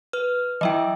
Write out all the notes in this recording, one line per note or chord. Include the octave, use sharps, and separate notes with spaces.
B4 F6
E3 F#3 E4 D#5 E5 G5